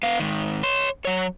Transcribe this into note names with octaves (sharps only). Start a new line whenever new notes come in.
B3 F5
G#2 D#3
C#5 C6
F#3 C#5